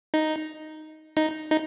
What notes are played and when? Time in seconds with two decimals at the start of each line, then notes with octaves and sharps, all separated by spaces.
0.14 D#4
1.17 D#4
1.51 D#4